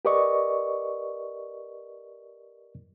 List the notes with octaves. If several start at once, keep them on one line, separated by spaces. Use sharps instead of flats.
G4 A#4 B4 D5 D#5 C#6